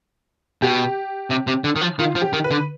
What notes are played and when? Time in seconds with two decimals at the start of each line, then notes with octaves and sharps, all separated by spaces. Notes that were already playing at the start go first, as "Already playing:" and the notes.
0.62 B2 G4
1.30 C3
1.47 C3
1.64 D3
1.76 D#3
1.81 F3
1.99 D#3 F4
2.15 F3
2.22 G4
2.33 D#3
2.44 B4
2.51 D3